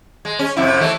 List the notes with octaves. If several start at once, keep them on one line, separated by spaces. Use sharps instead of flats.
G#3
C#4
F2 C3 E4
E3 A3